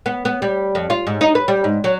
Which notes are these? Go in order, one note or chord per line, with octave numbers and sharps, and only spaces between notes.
B3
B3
G3
F2
F4
G#2
D#4
B4
G3
G#2
F#3